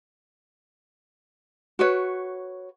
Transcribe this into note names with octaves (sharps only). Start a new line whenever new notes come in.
F#4 B4 C#5